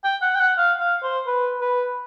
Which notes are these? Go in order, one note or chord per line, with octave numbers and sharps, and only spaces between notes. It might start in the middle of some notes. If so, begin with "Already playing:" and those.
G5
F#5
G5
F#5
F5
F5
C5
B4
B4